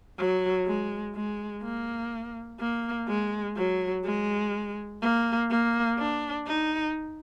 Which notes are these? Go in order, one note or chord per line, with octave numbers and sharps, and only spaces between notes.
F#3
G#3
G#3
A#3
A#3
G#3
F#3
G#3
A#3
A#3
D4
D#4